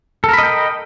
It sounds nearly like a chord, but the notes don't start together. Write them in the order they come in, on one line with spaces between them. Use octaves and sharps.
A4 A#4 B5 D#5 G5